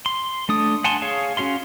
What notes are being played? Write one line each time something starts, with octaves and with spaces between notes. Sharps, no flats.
C6
A3 D4 D#6
F#5 G#5 A5 C6
G#4 C#5 F5
C#4 F#4 F5 C6